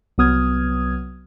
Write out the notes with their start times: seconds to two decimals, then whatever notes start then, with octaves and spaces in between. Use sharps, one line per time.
0.18 C2 F#3 B3 D#6 F6 G#6